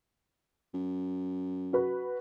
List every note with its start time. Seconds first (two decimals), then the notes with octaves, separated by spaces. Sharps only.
0.74 F#2
1.73 F#4 B4